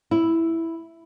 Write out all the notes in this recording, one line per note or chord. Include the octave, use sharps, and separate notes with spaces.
E4